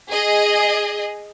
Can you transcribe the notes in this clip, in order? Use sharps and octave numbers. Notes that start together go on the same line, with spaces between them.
G#4 D#5